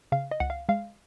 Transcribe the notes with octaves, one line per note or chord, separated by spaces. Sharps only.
C#3 F5
D#5
C#2 F#5
F5
G#3 F5